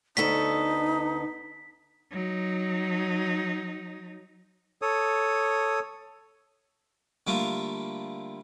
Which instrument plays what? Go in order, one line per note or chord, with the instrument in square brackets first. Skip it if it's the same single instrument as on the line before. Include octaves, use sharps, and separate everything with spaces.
[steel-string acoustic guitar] D2 B3 A4 [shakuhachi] D#4 [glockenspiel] B6
[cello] F#3 D#4
[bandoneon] A4 C#5 D#6
[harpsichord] D3 G3 A3 A#3 F4